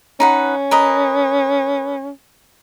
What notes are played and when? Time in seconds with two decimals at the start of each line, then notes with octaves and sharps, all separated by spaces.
0.20 C#4 D#4 B4 F#5
0.71 A#4 B4 D#5